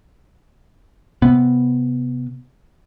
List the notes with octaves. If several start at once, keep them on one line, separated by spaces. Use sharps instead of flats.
C3 B3